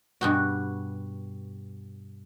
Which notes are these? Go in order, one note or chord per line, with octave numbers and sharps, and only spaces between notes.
G2 B2 F#4